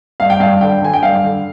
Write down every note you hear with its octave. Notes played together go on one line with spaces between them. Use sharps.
G2 F5
G5
G2 F5
D3 G5
D3 G#5
G5
G2 F5
D3